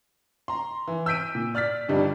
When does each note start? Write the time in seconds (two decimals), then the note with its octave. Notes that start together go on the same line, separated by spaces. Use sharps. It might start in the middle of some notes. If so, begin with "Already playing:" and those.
0.48 A#5 C6
0.87 E3
1.06 E6 G6 B6 D7 D#7
1.35 A#2
1.55 D5 F6 A6 B6
1.88 G1 G2 G3 D#4 D5